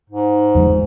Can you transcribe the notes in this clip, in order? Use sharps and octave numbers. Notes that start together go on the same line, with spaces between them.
G#2
E2 F3 G#3